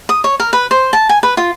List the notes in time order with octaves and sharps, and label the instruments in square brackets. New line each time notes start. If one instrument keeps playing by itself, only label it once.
[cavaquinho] D#6
C#5
A#4
B4
C5
A5
G#5
B4
F4